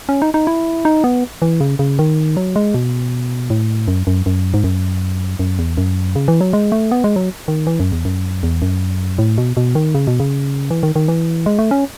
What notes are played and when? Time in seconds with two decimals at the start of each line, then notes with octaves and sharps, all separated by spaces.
0.09 C#4
0.22 D#4
0.34 D#4
0.47 E4
0.85 D#4
1.04 B3
1.42 E3
1.61 C#3
1.79 C#3
1.99 D#3
2.37 F#3
2.56 G#3
2.74 B2
3.50 A2
3.88 F#2
4.07 F#2
4.26 F#2
4.54 G#2
4.64 F#2
5.39 F#2
5.59 E2
5.77 F#2
6.15 C#3
6.28 E3
6.41 F#3
6.53 G#3
6.72 A3
6.91 B3
7.04 G#3
7.16 F#3
7.48 D#3
7.67 E3
7.80 F#2
7.92 E2
8.05 F#2
8.43 E2
8.62 F#2
9.18 A2
9.38 B2
9.57 B2
9.75 D#3
9.95 C#3
10.07 B2
10.20 C#3
10.71 E3
10.83 D#3
10.96 D#3
11.08 E3
11.46 G#3
11.59 A3
11.71 C#4